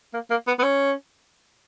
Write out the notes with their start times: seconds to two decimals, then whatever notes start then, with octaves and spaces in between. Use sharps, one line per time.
0.14 A#3
0.30 A#3
0.47 B3
0.59 B3
0.63 C#4